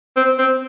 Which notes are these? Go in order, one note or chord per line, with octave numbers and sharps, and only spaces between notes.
C4
C4